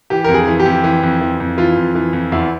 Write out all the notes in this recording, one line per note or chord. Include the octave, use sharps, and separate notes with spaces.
E3 G4
F2 A#4
G#4
E3
G4
F2
E3
F2
E3
F2
E3 F4
F2
E3
F2
E2 E4